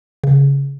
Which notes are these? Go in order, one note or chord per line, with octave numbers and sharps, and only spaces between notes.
C#3